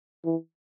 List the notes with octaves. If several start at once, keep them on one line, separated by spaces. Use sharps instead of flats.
E3